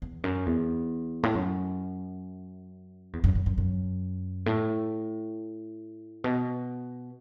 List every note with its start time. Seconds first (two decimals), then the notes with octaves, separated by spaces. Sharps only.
0.02 E2
0.24 F#2
0.46 E2
1.23 A2
1.35 F#2
3.13 E2
3.24 F#2
3.35 F#2
3.46 F#2
3.58 F#2
4.46 A2
6.24 B2